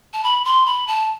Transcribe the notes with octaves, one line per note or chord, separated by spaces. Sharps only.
A5
B5
C6
B5
A5